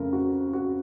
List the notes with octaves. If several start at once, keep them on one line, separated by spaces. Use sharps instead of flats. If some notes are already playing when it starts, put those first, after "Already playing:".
Already playing: F2 C#3 A3 A#4
F#4
F#4